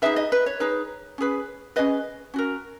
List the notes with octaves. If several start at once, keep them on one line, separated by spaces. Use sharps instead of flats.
D#4 G#4 B4 E5
D#5
B4
C#5
D#4 G#4 B4
C#4 G#4 B4
C#4 G#4 B4 D#5
C#4 F#4 A#4